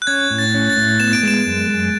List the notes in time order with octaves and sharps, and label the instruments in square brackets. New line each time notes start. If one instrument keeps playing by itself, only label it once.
[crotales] F#6
[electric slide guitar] C#4 [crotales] G#6
[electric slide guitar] A2
[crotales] A6
[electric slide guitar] C#4
[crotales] A6
[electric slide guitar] A2
[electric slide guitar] B3 [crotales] E7
[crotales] D7
[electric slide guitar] G#3 [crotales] E7
[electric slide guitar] F#2
G#3